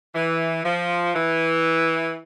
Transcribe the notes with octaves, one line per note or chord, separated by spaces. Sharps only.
E3
F3
E3